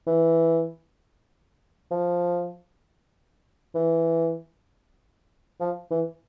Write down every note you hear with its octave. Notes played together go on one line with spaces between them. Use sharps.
E3
F3
E3
F3
E3